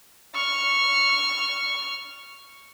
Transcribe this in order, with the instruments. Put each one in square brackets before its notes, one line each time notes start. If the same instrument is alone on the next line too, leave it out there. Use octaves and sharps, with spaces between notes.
[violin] C#6 F6